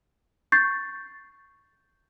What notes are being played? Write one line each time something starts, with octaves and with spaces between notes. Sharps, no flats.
C#6 G6 A6 C7